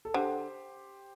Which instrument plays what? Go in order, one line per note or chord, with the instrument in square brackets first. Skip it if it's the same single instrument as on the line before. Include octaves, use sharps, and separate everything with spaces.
[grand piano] A4
[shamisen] D3 [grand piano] G4 C5